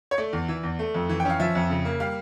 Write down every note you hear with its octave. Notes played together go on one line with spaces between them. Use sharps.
C#5
A3 D5
E2
E3
E2
A3
F2
E3
G5
C#4 F5
F3 E5
F2
C#3
A#3
G3 F5